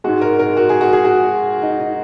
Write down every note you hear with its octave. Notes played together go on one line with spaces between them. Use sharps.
G#2 G#3 F#4
A#4
A#4
F#4
G#4
F#4
G#4
F#4
D#4
D#4